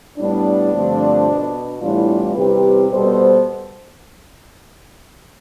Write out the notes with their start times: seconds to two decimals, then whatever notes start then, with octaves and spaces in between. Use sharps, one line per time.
0.18 A2 G3 B3 D4
0.73 G2 D3 F3 A3 C4
1.28 B2 B3
1.82 A2 E3 G3 B3 D4 F4
2.36 E2 C3 G3 C4 G4 B4
2.90 B2 G3 B3 A4 C5